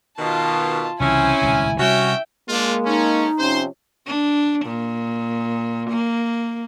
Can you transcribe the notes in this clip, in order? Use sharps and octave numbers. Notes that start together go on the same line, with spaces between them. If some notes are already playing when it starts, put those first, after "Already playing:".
B2 D#3 F4 A5
C2 C#3 E3 C4 C#4 E4 G#5
D#1 C#2 B2
C3 G3 C#4 F#4 E5 G5
G#3 A#3 C#4 D4 F4
A3 C#4 D#4
C3 F3 C#4 C5
D4
A#2
A#3